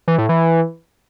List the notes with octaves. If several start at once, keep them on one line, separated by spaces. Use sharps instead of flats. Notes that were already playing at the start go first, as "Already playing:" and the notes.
E3
A2
E3